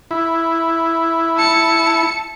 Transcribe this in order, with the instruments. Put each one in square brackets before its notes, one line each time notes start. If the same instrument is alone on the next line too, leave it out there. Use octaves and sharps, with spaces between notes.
[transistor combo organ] E4
[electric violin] A5 C#7